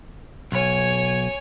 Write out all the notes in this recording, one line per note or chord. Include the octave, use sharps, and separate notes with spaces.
B1 C#5 G#5